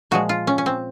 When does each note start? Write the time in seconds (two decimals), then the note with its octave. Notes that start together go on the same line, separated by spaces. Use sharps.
0.11 A#2 F3 G#3 F#4
0.29 F4
0.47 C#4
0.58 C#4
0.66 C4